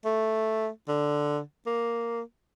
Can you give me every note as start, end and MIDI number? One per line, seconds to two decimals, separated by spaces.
0.05 0.69 57
0.88 1.40 50
1.66 2.22 58